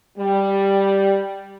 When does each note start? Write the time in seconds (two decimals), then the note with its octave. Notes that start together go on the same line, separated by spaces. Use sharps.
0.18 G3